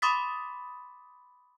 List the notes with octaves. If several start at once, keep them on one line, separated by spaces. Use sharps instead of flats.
B5 C6 D6 D#6 A6 B6